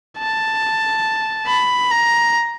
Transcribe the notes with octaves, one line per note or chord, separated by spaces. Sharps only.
A5
B5
A#5